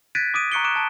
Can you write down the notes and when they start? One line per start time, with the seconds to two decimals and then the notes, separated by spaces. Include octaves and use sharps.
0.15 F#6 G#6 A6 B6 D7 D#7
0.34 D6 D#6 D7 D#7
0.52 A#5 C#6 F#6 C#7 D7 G7
0.64 C#6 D6 F#6 D7 E7
0.76 A5 D7